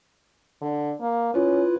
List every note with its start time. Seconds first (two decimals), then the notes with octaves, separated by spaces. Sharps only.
0.62 D3
1.01 A#3
1.34 C#4 E4 F4 B4